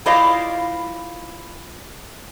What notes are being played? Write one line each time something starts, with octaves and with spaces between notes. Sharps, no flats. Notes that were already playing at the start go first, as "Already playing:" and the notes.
E4 F4 C5 D5 D#5 F5